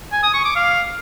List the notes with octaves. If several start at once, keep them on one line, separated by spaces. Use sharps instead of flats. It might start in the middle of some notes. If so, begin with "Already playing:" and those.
G#5
D#6
C#6
D6
F5